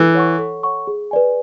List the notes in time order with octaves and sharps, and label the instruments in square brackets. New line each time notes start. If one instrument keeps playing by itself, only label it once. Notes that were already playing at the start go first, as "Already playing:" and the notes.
Already playing: [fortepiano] E3 [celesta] A4
[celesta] C#5 F#5 C#6
A4
C#5 F#5 C#6
G#4
B4 D5 G#5